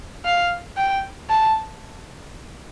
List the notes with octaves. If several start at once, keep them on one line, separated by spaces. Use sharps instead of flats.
F5
G5
A5